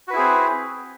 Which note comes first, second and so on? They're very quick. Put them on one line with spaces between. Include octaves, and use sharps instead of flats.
F#4 B4 E4 G#4 C4